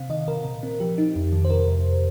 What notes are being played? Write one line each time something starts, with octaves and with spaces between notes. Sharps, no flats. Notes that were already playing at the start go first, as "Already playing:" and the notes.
Already playing: C3 C4 F5
D#3 D#5
C3 A#4
A#2
C4
F3 G4
D#4
F2
D#3
C5
C3 A#4
F2